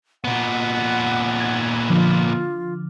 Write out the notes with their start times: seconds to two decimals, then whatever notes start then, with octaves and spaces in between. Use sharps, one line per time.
0.24 A#2 B3 F#5
1.40 G#6
1.90 D3 F3 F4